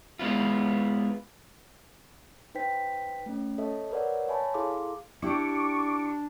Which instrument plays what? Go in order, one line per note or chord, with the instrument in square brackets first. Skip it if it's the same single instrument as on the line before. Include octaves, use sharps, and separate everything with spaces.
[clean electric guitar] G#3 B3 E4 F4
[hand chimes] D#4 B4 C5 G5 B6
A3 C#4
A4 C#5 D#5 E5
A#4 B4 C#5 D5 E5 F#5
C#5 E5 G#5 A5 B5
E4 G#4 A4 F5 C6 D6
[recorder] D4 [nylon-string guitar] E4 G4 [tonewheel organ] C#6 D6